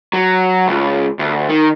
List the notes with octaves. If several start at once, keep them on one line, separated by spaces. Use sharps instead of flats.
F#3
C#2
D2
D#3